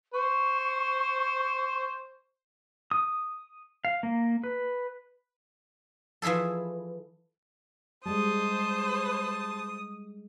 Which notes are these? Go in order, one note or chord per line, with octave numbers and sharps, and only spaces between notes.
C5 C#6
D#6
F5
A#3
B4
E3 F3 E4 G#4 A4
G3 G#3 C5 A5 D#6